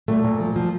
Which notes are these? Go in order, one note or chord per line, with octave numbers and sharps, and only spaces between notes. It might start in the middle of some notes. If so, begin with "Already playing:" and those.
A#2 A3
A#2
F3
F3